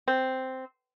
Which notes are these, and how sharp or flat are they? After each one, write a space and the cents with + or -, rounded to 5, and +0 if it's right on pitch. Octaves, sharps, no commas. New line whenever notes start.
C4 -5